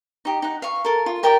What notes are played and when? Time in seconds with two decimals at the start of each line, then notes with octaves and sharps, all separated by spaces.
0.25 D#4 G4
0.42 D#4 F#5
0.62 F5 C#6
0.85 A4 A#4
1.06 F4
1.23 G4 A#4 D5 G5